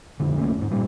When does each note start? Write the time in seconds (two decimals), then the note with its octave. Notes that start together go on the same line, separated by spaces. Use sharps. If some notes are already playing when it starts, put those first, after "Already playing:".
0.20 B1 F2 D3
0.38 C2 A3 A#3 C#4
0.58 E1 G#2
0.71 G2 A#2 G3